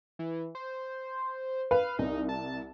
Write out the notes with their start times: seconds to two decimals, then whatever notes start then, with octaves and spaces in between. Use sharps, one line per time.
0.19 E3
0.55 C5
1.71 B4 F5
1.99 C2 D#4
2.29 A5